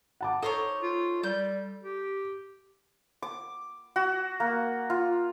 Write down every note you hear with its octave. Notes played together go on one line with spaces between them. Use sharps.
F#5 A5 D6
D#4 A4 C5 C#5
F4
G3 G6
G4
D6
F#4
A#3
F4